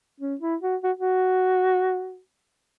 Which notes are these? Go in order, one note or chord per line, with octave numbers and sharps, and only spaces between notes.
C#4
E4
F#4
F#4
F#4